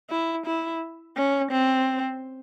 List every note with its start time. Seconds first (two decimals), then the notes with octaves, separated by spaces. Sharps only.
0.10 E4
0.46 E4
1.17 C#4
1.52 C4